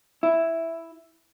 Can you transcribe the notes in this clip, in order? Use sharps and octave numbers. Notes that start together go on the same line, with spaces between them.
E4